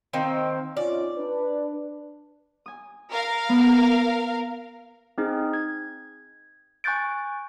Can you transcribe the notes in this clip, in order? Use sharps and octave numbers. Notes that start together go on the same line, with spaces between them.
D#3 A#3 C4
C#4 D#4 F4 D5
D4 B4
G#5 D#6
A#4 F5
B3
C4 D#4 G#4
G#6
G#5 C#6 F#6 G6 A6 D7